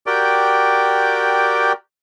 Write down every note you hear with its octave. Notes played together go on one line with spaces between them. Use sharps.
F#4 G4 A#4 D5 G5